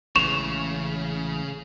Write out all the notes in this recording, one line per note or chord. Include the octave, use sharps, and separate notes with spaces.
A1 C#3 E3 G#3 C#6 E7 F7